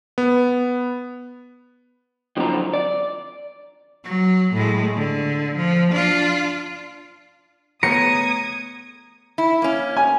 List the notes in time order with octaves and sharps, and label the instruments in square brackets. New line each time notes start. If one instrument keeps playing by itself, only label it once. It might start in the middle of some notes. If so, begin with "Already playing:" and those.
[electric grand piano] B3
[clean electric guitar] F#2 D3 E3 F3 C4 A#5
D5
[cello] F#3
A2 G#3
D3
F3
D4 F4
[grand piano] A3 B3 C#5 [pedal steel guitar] A#5 [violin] D#6 G#6 [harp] C#7
[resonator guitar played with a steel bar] E4
A#3 C#4
[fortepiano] G#5